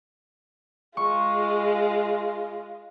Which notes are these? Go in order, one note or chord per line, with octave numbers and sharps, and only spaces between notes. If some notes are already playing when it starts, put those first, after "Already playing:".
G#3 F4 C#6